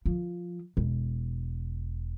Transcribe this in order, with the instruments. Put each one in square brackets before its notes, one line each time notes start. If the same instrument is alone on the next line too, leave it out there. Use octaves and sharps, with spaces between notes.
[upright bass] F3
E1